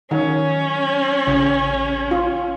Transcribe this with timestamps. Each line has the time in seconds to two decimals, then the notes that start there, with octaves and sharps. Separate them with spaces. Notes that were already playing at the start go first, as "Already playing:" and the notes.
0.11 D#3 F#3 C#4
1.27 A1 C#3
2.11 F4